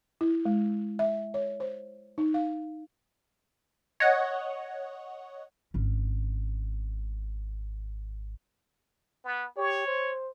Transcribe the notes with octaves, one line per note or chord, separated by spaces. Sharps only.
E4
G#3
E5
C#5
C5
D#4
F5
C#5 D#5 F#5
G#1 C#4
B3
G4 C#5
C5